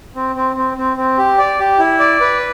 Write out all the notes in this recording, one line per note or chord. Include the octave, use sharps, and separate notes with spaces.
C4
C4
C4
C4
C4
G4
D5
G4
E4
D5
B4